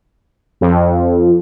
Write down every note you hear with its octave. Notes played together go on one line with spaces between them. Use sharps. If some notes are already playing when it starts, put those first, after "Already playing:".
F2